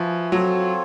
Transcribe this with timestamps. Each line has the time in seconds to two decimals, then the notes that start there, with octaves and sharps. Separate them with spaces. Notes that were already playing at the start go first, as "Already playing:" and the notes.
Already playing: F3 F#4 B4 E5 G#5
0.31 F#3 C4 F4 A4 C#5